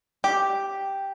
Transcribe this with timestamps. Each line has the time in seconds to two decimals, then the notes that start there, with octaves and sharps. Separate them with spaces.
0.24 G4